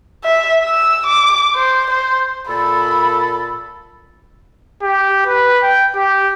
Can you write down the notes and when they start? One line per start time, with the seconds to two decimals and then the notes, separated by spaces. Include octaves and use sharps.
0.24 E5
0.64 E6
1.07 D6
1.54 C5
1.91 C5
2.49 A#2 A4 B5
4.82 G4
5.27 B4
5.63 G5
5.95 G4